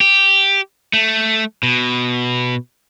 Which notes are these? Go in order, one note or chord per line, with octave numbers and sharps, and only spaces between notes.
G4
A3
B2